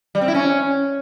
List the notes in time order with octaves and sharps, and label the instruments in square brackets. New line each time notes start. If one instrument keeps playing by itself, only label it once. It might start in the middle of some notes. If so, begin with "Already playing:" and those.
[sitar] G3
C4
E4
C#4